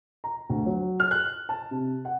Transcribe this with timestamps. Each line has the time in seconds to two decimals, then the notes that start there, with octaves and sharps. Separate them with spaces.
0.24 A#5
0.50 D2
0.66 F#3
1.00 F6
1.11 F#6
1.49 A5
1.71 C3
2.05 F#5